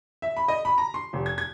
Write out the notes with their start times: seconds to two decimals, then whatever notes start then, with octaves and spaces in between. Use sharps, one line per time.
0.22 E5
0.37 B5
0.48 D#5
0.65 B5
0.78 A#5
0.94 C6
1.13 F1
1.26 G#6
1.38 G#6